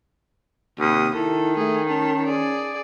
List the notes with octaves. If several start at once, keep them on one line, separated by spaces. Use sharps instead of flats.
D#2 C3 D#6
D#3 E4 A4
A3 G#4
C#4 A5
G#4 D5